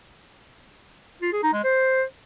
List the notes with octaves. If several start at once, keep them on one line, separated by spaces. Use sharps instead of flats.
F4
G#4
D#4
G#3
C5